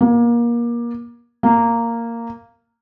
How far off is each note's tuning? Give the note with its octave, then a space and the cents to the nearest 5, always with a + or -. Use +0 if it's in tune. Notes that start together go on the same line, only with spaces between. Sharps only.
A#3 +25
A#3 -10